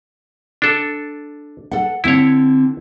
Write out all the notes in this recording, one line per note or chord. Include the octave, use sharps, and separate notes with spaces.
D4 A4
A4 F#5
D3 C4 E4 C#5